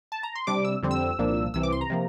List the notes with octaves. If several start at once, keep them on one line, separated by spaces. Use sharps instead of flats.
A5
A#5
C6
C3 G3 D4 D6
E6
F2 D3 G3 C4
E6
C2 A#2 F3 A#3 D4
C2 C3 E3 E6
D6
C6
A#5
C3 F3 A#3